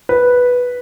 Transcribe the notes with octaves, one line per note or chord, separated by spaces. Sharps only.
B4